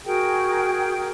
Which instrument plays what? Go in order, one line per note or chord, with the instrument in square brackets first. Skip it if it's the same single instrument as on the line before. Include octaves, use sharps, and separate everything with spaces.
[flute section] F#4 G#4 A#4 G5